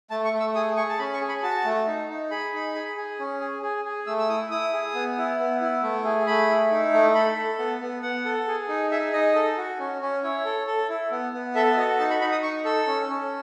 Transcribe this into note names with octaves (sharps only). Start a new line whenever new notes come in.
A3 A5
C#6
A3
E6
G#4 D#6
G#4 C#6
A5
C#4 B5
C#6
G#4
B5
F#4 A5
A3
D#4
D#4
G#4 B5
D#4
G#4
G#4
C#4
G#4
G#4
G#4
A3 E6
E6
E4 D#6
E4 D#6
G#4
B3
E4
B3
E4
A3
G#4
A3 B5
E4
D#4
A3
A4 B5
A4
B3
B3
B3 F#5
A4
G#4
D#4
G#4 E5
D#4 D#5
A4
F#4
C#4
C#4
E4 C#5
A4
A4
E4
B3
B3
A4 E5
F#4 D#5
D#4 A5
B5
D#4 B5
D#6
D#4 C#6
A4 E6
C#4
C#4